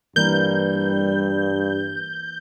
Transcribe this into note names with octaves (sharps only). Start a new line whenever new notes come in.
G2 E3 G3 A#3 A#4 G6